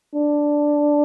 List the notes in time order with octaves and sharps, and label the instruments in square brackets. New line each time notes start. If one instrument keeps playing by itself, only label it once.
[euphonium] D4